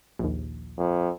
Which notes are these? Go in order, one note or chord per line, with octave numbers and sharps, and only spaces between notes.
A#1 D#2
F2